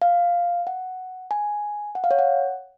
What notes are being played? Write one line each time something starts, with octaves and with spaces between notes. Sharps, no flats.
F5
F#5
G#5
F#5
F5
C#5
F#5